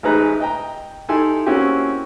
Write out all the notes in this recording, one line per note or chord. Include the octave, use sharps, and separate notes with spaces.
A1 G#3 D#4 B4 A#5
D#5 G5 A#5
D#4 E4 G4 A4 G#5 C6
A#3 C4 C#4 E4 F#4 G4